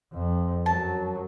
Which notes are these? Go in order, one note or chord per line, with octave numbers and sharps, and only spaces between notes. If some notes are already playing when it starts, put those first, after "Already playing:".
F2
F#2 F#3 A5